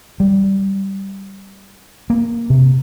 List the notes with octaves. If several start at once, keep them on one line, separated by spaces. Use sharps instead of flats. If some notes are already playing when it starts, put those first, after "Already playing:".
G3
A#3
C3